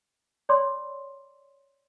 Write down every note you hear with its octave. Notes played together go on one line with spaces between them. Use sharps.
C#5 D5 B5 C6 D6